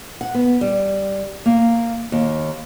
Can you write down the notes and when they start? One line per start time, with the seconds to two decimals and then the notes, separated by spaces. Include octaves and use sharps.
0.21 F#5
0.35 B3
0.61 G3
1.46 A#3
2.12 D#2